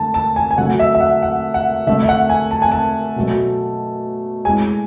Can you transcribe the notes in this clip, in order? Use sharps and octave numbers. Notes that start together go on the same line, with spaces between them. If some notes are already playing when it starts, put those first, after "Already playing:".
Already playing: D3 A3 A5
A5
G#5
G#5
D3 F#3 A3 F#5
E5
E5
F#5
F#5
F#5
D3 A3 E5
E5
F#5
G#5
A5
G#5
A5
B2 F#3 A3
A2 G#3 G#5